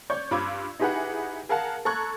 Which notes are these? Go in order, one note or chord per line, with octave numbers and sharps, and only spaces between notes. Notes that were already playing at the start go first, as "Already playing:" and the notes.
C#5 D5 C#6 G6
G2 F4 B5 D6 E6 G#6
D#4 E4 G4 G#4 B4 F#5
G#4 A#4 F5 F#5 A5
A4 A#5 C#6 F#6 G#6